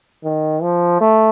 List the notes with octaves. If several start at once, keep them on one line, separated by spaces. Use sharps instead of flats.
D#3
F3
A3